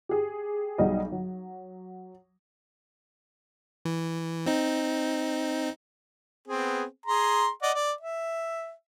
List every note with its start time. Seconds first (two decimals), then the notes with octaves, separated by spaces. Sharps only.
0.09 G4 G#4
0.78 B1 F#3 G3 D#4 G#4 D#5
1.12 F#3
3.85 E3
4.46 C4 D#4
6.48 B3 C4 G#4
7.06 G#4 A#5 C6
7.62 D5 D#5 F#5
7.74 D5
8.01 E5